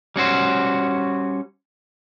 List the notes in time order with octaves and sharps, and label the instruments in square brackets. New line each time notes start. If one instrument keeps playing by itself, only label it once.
[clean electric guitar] G3 C#4 F#4 C5